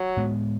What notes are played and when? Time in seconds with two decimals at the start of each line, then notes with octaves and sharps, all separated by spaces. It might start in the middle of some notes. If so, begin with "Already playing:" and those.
Already playing: F#3
0.17 A2 G#3 B3